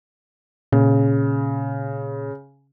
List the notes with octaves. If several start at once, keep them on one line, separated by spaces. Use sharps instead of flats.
A#2 C#3